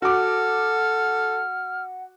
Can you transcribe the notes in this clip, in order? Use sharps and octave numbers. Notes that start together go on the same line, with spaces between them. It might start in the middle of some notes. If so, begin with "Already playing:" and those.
F#4 A4 F#5 D6 F6